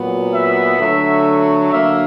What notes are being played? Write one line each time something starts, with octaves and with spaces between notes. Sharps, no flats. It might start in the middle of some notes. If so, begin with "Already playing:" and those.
Already playing: A#2 F#3 B3
E5
D3 F#3 A3
D3 F#3 A#3 E5